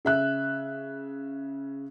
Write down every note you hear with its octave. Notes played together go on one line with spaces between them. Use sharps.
C#3 E5 F#6